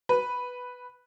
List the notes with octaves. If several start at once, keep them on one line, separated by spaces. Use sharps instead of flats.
B4